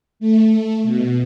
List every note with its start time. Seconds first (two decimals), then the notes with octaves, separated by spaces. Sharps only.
0.20 A3
0.84 B2